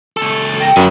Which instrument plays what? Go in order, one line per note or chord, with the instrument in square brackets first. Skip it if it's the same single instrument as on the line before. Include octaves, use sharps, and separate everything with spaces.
[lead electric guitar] C#2 A4
[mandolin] G5 A#5
[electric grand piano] F#2 [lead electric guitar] D3 F#4 [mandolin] B5